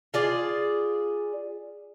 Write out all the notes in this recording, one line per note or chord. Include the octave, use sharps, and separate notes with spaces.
F4 G#4 D5